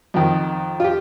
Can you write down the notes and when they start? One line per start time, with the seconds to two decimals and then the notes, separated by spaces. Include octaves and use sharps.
0.14 F2 D#3
0.80 F4
0.84 G4